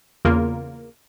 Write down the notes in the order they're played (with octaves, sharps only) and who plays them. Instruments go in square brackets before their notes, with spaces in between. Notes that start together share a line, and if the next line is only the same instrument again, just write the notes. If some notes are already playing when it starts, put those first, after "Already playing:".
[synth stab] E2 C#3 A#3 F4 A#4